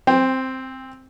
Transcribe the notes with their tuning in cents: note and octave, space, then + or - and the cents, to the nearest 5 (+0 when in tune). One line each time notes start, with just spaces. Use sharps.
C4 +0 G5 +30